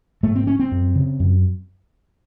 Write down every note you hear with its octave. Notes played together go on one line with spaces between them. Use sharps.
G#2 A3
C4
C#4
C4
F#2
C#3
F#2